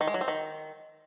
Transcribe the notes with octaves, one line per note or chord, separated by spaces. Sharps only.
D#3
G#3
F#3
C4
D#3